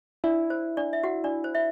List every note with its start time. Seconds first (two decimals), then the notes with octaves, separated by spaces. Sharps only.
0.24 D4 E4 D5
0.50 C5
0.77 D4 D5
0.93 E5
1.04 F#4 F#5
1.24 D4 D5
1.44 C5
1.55 E5